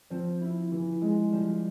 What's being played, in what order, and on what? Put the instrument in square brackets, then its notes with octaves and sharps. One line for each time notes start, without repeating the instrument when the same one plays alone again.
[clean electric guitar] F3 [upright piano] C4
[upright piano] E4
E3
G#3
[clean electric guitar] F3 [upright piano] G3